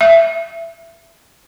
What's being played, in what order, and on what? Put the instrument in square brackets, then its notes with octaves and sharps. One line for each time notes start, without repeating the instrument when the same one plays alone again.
[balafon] E5